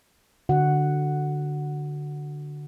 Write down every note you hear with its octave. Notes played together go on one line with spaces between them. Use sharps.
D3 F#4 F#5